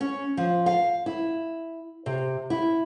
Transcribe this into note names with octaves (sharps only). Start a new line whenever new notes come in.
C#4
F3
F5
E4
C3
E4